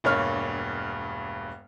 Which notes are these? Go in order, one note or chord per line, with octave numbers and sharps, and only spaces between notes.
E1 G2 A#3 C#5 F6